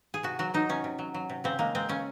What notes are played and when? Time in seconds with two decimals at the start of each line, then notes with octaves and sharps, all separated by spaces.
0.14 G#4
0.23 C3 F#4
0.39 F#3 F#4
0.54 F#3 D#4
0.69 C3 C#4
0.84 C3
0.99 F#3
1.14 F#3
1.30 C3
1.44 C#3 C4
1.59 G#3 A#3
1.75 G#3 C4
1.89 C#3 C#4